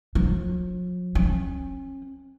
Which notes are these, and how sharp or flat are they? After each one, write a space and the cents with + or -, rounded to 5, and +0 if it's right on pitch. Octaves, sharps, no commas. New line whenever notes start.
F3 +45
C#4 -35